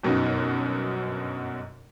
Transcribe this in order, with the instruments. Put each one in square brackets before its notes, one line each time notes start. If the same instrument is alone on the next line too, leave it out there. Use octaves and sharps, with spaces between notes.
[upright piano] G1 F#2 B2 D#4